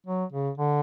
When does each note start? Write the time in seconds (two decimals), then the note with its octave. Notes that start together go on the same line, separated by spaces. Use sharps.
0.07 F#3
0.32 C#3
0.58 D3